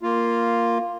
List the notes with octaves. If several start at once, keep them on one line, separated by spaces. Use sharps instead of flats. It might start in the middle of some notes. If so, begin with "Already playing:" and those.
A#3 F4